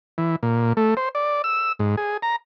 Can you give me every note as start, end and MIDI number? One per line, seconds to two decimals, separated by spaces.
0.18 0.36 52
0.43 0.73 46
0.77 0.94 57
0.97 1.09 72
1.15 1.42 74
1.44 1.72 88
1.79 1.96 44
1.97 2.17 68
2.22 2.36 82